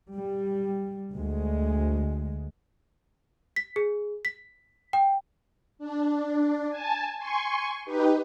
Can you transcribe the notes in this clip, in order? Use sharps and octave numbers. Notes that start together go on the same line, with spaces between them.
G3
D2 G#3
B6
G#4
B6
G5
D4
G#5 A5
G#5 C6 C#6
D#4 G4 B4